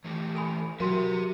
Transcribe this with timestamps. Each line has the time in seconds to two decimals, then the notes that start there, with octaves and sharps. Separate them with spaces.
0.04 E3 A3 G4
0.35 A4 G#5 B5
0.80 F#3 E4 F#4 G4 A#4 E5